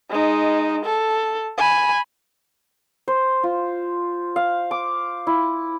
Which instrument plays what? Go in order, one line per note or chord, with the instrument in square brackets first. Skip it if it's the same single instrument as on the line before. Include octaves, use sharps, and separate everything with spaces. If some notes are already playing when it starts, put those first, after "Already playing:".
[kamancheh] G#3 D#4
A4
G#5 B5
[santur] C5
F4
F5
D6
E4